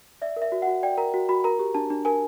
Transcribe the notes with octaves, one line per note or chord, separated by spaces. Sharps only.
D5 E5
A#4
E5
F#4
F#5
F#4
D5 G5
A#4 A#5
F#4
F#4 B5
A#4 A#5
G4
D4 A5
D4
A#4 G#5